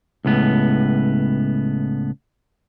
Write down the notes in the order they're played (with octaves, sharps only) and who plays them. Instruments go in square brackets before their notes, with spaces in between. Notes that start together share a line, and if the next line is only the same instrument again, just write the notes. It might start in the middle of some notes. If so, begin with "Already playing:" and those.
[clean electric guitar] C#2 A2 B3